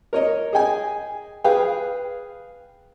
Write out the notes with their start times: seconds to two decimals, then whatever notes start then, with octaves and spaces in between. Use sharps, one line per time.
0.13 A#4 C#5 D#5
0.53 G#4 D#5 G5 G#5
1.44 G#4 B4 F5 G5